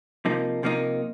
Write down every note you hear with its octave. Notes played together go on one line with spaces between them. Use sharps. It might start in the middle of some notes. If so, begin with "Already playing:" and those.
C3 F3 A#3 D#4
C3 F3 A#3 D#4